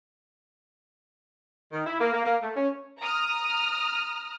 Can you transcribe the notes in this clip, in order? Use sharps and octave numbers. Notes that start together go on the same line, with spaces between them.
D#3
E4
A#3
A#3
A#3
A3
C#4
A#5 D#6 F6